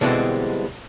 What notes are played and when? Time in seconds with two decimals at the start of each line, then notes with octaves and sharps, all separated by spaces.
0.01 B2 D3 E3 G3 G#3 C4